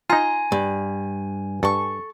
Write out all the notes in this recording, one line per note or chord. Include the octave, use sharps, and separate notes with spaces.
D#4 F4 G#5 A#5 C6
G2
G2 A4 C#6